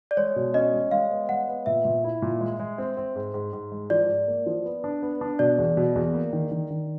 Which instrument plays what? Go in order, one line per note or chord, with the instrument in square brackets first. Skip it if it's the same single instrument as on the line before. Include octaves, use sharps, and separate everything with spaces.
[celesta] D5
[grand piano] G#3 [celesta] C#5
[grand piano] B2
[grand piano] C#4 [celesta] D#5
[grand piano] G#3
[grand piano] G#3 [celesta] F5
[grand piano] B3
[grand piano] G#3 [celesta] F#5
[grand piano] B3
[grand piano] A#2 [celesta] E5
[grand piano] A#2
E4
A#2
G#3
G#3
C4
C4
G#2
G#2
G#2
G#3
[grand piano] F3 [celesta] D5
[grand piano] G#2
A#3
F3
B3
D4
B3
D4
[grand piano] B2 [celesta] D5
[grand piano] E2
B2
E2
A#3
D#3
D#3
D#3